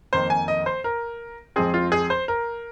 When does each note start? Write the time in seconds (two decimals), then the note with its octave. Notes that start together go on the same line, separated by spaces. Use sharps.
0.13 F2 D#3 A#3 C5
0.30 G#5
0.48 D#5
0.66 C5
0.84 A#4
1.56 F2 F3 G#3 C4 G#4
1.74 F4
1.92 G#4
2.10 C5
2.28 A#4